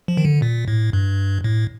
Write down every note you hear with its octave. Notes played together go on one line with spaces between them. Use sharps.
F3
D#3
D3
A#2
A2
G2
A2